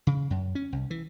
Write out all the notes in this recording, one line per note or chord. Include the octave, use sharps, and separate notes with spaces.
C#3
F#2
C#4
C2
E3